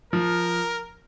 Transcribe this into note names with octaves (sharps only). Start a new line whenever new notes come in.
F3 A#4